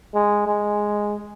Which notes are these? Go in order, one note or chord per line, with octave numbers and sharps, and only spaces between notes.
G#3
G#3